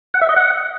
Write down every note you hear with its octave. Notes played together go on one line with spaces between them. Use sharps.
F#5
E5
D#5
F#5